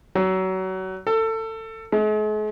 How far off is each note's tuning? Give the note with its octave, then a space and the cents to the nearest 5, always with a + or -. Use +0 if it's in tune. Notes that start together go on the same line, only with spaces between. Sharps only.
F#3 +25
A4 +25
G#3 +45